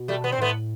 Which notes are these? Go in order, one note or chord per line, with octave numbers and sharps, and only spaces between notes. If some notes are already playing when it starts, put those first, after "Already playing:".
Already playing: B2
G3 A3
B3
C4
A2 A3 B3